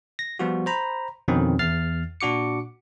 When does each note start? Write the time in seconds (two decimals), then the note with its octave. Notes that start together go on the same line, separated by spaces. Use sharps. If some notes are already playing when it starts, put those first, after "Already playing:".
0.19 A#6
0.39 F3 G3 B3 F4 F#4
0.66 C5 A#5 B5
1.28 F2 B2 D3 D#3 C4 C#4
1.59 E2 F6 A6 C7
2.21 A#2 D4 F#4 D6 C#7